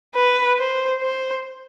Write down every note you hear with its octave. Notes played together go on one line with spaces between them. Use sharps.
B4
C5
C5